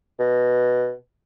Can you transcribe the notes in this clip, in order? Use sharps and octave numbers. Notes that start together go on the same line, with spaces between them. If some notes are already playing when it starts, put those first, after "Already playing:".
B2